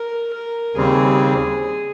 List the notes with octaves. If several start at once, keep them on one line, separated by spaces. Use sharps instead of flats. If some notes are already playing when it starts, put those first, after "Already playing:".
Already playing: A#4
A#4
D#2 C#3 G3 C4 G#4